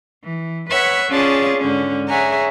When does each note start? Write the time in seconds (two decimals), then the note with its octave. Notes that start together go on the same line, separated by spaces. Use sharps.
0.24 E3
0.69 B4 C#5 E5 F#5
1.09 C#4 F4 G#4 C#5 D5 A5
1.58 G#2 D3 C#4
2.08 G#4 C#5 E5 F#5 G#5 A#5